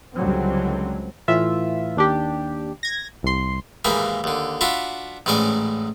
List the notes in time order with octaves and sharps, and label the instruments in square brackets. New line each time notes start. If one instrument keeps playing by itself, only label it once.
[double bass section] C#2 D3 F#3 G3 C4
[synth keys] A2 E3 F4 E5
D#2 D4 G4
G#6 A#6
C2 C6
[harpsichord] D#2 G#2 E3 A#3 G#5 B5
D#2 D3
D4 F4 F#4 E5 B5
A1 G#2 E3 C#4 D5 G#5